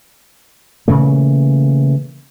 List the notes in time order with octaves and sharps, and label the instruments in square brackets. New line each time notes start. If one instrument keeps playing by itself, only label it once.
[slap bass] A#2 C#3 E3 A3